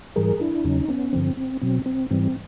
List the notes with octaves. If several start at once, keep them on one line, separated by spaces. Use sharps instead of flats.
G#2 E3 G3 G#4 A#4
D4 E4
E2 C#3 F#3 C#4 D#4
B3 C#4
G2 D3 F3 C4
C4
B2 F#3 C4
C4
G#2 E3 G3 C4